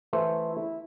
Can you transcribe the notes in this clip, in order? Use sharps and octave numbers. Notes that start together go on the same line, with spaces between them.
E3 A3 C5
E4